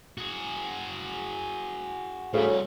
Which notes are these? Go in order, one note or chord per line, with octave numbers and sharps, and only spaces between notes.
F#4 G#4
D2 A2 C#3 G3
C2